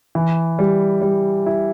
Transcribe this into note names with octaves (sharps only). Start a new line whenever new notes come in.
E3
G3
G3
E4